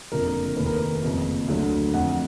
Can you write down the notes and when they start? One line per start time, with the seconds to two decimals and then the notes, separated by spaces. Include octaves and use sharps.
0.11 F#1 F2 D3 F3 A#4
0.56 F1 D#2 D#3 B4
0.66 A#4
0.76 B4
1.03 F#1 F2 F3
1.48 D2 D3 F#3
1.94 F2 F3 F#5